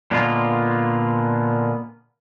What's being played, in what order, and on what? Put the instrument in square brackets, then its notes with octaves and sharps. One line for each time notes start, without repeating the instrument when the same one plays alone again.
[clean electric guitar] A#2 D3 G#3 A#3 B3 F4